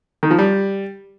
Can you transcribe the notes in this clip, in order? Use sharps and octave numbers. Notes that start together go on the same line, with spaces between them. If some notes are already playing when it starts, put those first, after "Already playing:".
D#3
F3
G3